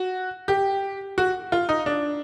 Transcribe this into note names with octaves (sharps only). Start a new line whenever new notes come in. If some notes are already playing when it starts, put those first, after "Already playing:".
Already playing: F#4
G4
F#4
F4
D#4
D4